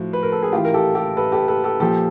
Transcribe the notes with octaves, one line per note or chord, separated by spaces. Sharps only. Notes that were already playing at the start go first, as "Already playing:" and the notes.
Already playing: A2 F3 F#4
B4
A#4
A4
G#4
A2 E3 F4 G4
A#4
G4 A4
G4 A4
A4 B4
G4 A4
A4 B4
G4 A4
A#2 F3 G4 A4